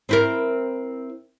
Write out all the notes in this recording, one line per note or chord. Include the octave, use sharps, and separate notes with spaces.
C4 E4 A#4